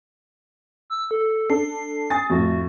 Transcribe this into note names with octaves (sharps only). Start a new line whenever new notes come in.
E6
A4
D4 A4 C7
G#5 D#6 A6
F2 A2 F#4